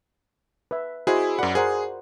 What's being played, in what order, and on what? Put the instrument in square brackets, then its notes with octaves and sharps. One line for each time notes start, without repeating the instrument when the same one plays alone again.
[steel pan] B4 E5
[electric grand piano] E4 G#4 [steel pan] F#4 C5 D#5
[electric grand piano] F#2 F#5 [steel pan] A#4 D5 B5
[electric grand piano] G#4 [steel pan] A#4 C5 F#5